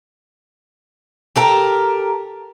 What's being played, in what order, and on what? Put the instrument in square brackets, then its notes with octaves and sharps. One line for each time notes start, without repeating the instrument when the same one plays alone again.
[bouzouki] G4 A4 A#4